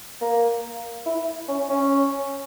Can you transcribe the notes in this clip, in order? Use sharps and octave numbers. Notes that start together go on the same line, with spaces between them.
A#3
E4
C#4
C#4